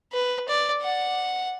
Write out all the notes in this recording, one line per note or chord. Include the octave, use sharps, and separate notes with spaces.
B4
D5
F#5